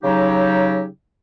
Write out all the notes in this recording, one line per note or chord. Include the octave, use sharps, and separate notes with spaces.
C#3 F#3 D#4 G4